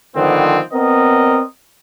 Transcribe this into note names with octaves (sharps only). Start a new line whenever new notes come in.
D3 D#3 F3 G#3 B3 C4
B3 C4 A#4 D5 D#5